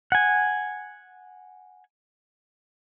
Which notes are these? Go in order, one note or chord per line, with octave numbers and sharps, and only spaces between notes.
F#5 G#5